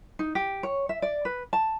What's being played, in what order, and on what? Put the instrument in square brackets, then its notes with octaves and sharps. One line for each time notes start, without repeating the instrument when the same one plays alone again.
[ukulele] D#4
G4
C#5
E5
D5
B4
A5